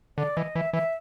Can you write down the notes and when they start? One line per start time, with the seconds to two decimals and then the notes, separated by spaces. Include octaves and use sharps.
0.18 D3 D5
0.37 E3 D#5
0.55 E3 E5
0.73 E3 E5